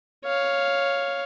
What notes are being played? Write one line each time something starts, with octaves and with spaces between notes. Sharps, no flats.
C#5 F5